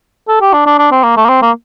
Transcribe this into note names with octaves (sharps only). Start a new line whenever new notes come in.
A4
G4
D4
D4
D4
C4
A#3
A3
A#3
C4
A#3